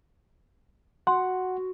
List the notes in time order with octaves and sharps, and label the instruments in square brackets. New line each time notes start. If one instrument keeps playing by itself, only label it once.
[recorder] F#4 [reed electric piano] F#5 [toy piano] C6